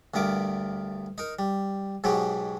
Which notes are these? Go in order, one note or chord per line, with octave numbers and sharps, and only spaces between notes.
D2 G2 B3 A#4 D6
D#4 A#4
G3
G#2 B2 F#3 G#3 G4